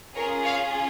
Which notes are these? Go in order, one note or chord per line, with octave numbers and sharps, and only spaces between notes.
C#4 F4 G#4 A#4 C#5
C#5 F5